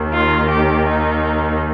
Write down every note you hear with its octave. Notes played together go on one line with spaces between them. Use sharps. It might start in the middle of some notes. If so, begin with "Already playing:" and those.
Already playing: D#2 D#3
F4
G4
D#4